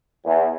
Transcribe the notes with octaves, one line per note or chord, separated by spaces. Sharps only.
E2